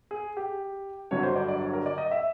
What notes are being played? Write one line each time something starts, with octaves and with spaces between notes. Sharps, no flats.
G#4
G4
G1 G2 D3 F#3 C#5
C5
D5
D5
C#5
A#4
D5
D#5
E5